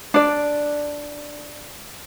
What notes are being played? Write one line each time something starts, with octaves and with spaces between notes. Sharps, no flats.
D4 D5